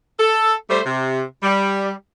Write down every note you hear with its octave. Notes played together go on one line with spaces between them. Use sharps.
A4
G3 A3 C5
C3
G3